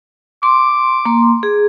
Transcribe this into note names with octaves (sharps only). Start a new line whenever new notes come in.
C6 D6
A#3 C6
G#4